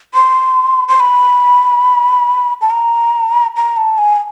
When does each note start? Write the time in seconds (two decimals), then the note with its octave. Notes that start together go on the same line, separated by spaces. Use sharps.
0.14 C6
0.88 C6
1.00 B5
2.61 A5
2.70 A#5
3.56 A#5
3.77 A5
3.98 G#5